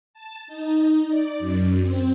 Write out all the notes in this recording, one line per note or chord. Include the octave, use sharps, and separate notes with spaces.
A5
D#4
D5
F#2
C4